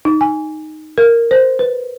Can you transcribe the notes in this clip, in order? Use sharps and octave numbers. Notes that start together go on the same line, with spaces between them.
D#4
G#5
A#4
C5
B4